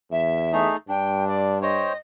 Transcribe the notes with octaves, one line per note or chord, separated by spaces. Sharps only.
E2 E5
A3 D#4 G#4
G2 D4 G5
D5
C5 C#5 D#5 G5